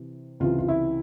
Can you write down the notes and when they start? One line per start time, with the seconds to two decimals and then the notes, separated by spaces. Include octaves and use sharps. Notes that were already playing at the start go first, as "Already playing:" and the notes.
Already playing: C3 E3
0.40 C#2 C3 E3 F4
0.59 F4
0.68 E4